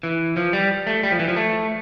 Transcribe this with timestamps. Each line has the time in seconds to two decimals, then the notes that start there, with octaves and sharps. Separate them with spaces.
0.03 E3
0.37 F3
0.53 G3
0.87 A3
1.03 G3
1.12 F3
1.19 E3
1.28 F3
1.36 A3